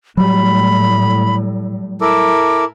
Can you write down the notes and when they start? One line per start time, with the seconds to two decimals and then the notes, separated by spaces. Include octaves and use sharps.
0.17 A2 F#3 G3 B5
2.01 E4 A4 A#4 D6